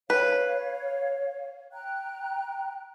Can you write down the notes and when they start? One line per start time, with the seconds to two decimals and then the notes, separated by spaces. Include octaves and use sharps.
0.10 B4 C#5 F5
1.73 G5 A#5 F#6